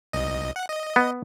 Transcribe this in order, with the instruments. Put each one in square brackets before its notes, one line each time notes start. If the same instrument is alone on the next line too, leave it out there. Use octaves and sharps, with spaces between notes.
[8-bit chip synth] C2 D#5
F#5
D#5
[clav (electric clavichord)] B3